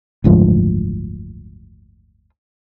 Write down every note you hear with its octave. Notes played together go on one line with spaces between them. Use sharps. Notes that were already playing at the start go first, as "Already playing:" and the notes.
F#1 D2 G#2 F3